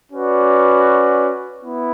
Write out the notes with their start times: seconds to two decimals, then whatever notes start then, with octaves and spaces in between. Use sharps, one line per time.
0.12 C#4 F#4 B4 D5
1.63 B3 E4